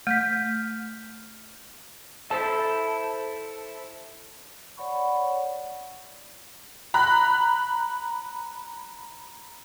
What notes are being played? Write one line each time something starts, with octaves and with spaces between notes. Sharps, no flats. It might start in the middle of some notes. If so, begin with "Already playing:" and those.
A3 F6 G6 B6
E4 A4 C5 A5
C#5 D5 F#5 B5 C#6
A#5 B5 F#6